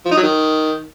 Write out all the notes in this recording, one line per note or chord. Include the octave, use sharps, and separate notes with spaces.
F3
D#4
F#3
D#3